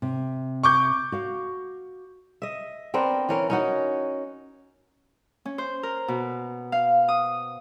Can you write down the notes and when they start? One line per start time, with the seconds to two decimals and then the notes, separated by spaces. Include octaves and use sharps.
0.02 C3
0.64 C#6 D6 G6
1.12 F#4 F5
2.42 D#5 E5
2.94 B3 C4 D4 A#4
3.29 E3 C#4 A#4
3.50 C#4 D#4 F#4
5.45 C#4
5.58 C5
5.83 A#4
6.08 B2
6.72 F5
7.08 D#6